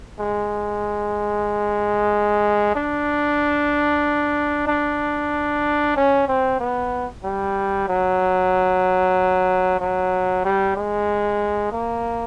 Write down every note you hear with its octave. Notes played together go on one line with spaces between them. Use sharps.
G#3
D4
D4
C#4
C4
B3
G3
F#3
F#3
G3
G#3
A#3